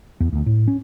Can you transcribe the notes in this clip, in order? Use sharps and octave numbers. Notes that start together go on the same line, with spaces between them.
E2
D2
A2
C#4